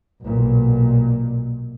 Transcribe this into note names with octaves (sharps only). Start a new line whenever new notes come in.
B1 A#2